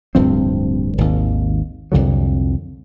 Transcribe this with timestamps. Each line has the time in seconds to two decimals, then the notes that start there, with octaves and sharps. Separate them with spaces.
0.15 D1 G2 F3 C4
0.98 G#1 D#2
1.92 C2 F2 D3 F#3